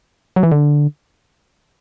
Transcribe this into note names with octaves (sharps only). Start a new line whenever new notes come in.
F#3
E3
D3